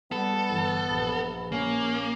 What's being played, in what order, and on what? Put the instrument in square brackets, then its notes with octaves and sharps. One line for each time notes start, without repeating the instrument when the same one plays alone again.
[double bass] G3 [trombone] B3 [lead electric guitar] A4
[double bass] G1 E3
A#1
[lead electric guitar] A#3 [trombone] C#4